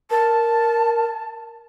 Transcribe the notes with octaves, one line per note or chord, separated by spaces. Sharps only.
A#4 A5